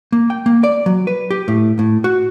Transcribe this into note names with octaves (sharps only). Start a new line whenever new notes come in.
A#3
G5
A#3
D5
F#3
B4
G4
A2
A2
F#4